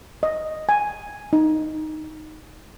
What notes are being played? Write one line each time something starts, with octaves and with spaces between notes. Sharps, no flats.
D#5
G#5
D#4